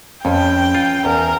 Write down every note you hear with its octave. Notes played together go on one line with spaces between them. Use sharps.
F2 C#4 B4 G5
F4
E2 A#4